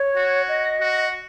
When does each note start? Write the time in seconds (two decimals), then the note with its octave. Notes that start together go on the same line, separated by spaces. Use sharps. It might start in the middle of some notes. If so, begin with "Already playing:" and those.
Already playing: C#5
0.16 F#4
0.49 D#5
0.81 F#4